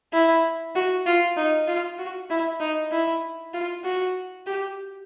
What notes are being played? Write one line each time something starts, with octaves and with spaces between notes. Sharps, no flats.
E4
F#4
F4
D#4
F4
F#4
E4
D#4
E4
F4
F#4
G4